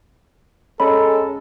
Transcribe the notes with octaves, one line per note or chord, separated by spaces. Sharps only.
G#3 C#4 A4 C#5 A#5 B5